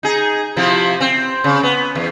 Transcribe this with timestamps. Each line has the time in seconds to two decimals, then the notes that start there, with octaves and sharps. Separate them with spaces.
0.03 D#4 G#4
0.57 C3 F3 E4
1.01 C4
1.44 C#3
1.63 B3
1.95 E2